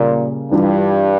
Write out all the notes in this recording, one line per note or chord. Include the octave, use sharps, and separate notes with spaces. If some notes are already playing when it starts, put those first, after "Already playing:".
Already playing: A#2 C#3 G3 A#3 C#4
G2 E3 G3 D4 F4